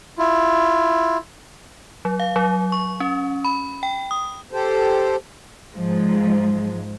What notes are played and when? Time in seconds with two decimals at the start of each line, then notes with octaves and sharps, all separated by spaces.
0.18 E4 F4
2.05 F#3
2.20 F5
2.36 F#3
2.72 C#6
3.00 C#4
3.45 B5
3.83 G5
4.11 D#6
4.51 G4 A4 C5
5.73 G#2 F3 G#3